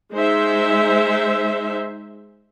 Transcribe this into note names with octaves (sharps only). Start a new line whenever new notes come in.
G#3 D#4 C5 E5